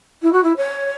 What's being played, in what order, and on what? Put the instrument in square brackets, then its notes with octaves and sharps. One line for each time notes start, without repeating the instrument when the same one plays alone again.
[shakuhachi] E4
F#4
E4
C#5